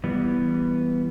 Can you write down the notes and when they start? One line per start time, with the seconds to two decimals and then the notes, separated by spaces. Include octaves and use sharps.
0.04 E3 G3 B3